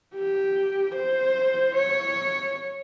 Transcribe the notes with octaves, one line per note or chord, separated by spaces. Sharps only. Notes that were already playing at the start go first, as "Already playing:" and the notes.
G4
C5
C#5